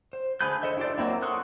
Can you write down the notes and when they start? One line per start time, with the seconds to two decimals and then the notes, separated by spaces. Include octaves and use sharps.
0.13 C5
0.41 D3 A3 G#4 B4 G6
0.63 A4 C5 D#5 E5
0.77 D4 E4 G4 C5 D5
0.98 F#3 A#3 C4 E4
1.22 A4 C6 C#6 D#6 F#6